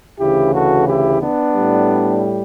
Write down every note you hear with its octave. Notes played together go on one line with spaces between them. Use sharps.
D2 C#3 E3 E4 G4
F#4 A4
E4 G4
B3 D4
A2 G3